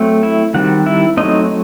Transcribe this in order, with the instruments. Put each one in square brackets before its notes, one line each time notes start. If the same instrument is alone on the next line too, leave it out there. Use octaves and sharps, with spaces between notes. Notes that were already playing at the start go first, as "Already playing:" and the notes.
Already playing: [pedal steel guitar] F#3 A3 C4
E4 E5
D#3 G3 C4 F#4 F#5
E4 E5
F#3 A3 C4 D#4 D#5